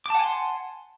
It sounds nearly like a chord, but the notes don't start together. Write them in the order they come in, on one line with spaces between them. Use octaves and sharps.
D6 A5 F#5 G#5 C6